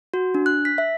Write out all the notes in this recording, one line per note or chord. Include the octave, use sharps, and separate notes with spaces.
F#4
D4
F#6
B6
E5